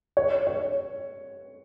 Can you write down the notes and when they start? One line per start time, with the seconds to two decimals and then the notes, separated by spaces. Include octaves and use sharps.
0.17 C#5
0.47 C#5